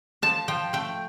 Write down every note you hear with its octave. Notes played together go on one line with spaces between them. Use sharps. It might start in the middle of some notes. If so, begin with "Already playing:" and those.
F3 A5
F3 G5
A3 G5